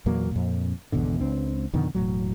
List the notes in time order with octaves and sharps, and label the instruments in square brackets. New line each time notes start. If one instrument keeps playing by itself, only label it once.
[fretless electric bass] E2 A#2 F#3 A#3
F2 A#2
G#1 E2 B2 D3
C#2 C4 D4
F2 B2 D3 D#3
E1 A2 F#3